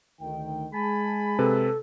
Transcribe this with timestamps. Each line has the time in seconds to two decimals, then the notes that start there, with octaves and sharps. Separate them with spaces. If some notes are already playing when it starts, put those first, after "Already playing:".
0.20 D2 D#3 G5
0.73 G#3 G#4 G#5 A5 B5
1.39 C3 A4 B4